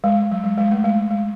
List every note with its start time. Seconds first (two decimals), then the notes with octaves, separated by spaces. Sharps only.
0.04 G#3
0.32 F#3
0.44 G#3
0.58 G#3
0.71 A3
0.84 G#3
1.11 G#3